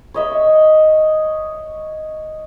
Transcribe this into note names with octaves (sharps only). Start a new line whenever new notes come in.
C#5 D#5 E5